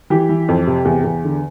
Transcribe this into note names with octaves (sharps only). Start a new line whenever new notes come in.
E3 G4
E3
F2
C3
E2
E2
D3